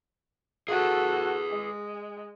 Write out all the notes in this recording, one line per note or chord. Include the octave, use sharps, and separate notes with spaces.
F#4 G#4 A4 B4
G#3